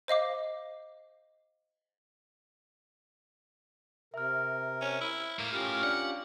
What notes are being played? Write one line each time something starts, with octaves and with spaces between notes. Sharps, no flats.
C5 D#5 F5 D6
C3 A#4 E5 F6
C#4
E4
A2 A#3
C#4 F4 G4 A#4
D4 D5 F5 F#5